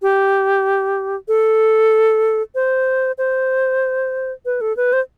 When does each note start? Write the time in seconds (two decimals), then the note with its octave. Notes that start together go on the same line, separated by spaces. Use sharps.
0.02 G4
1.28 A4
2.55 C5
3.18 C5
4.45 B4
4.61 A4
4.77 B4
4.93 C5